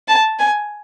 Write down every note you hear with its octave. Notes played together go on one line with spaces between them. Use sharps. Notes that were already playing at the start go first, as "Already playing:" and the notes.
A5
G#5